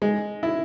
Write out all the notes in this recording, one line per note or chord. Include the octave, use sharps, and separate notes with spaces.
G#3
E4